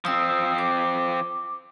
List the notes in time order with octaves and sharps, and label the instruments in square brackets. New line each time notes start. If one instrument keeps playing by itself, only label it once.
[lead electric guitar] F3 C4 [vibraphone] D#6 E6
[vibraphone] D6